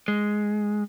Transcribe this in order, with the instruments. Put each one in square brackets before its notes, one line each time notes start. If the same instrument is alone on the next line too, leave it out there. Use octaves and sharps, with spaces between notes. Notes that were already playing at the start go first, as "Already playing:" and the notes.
[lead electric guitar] G#3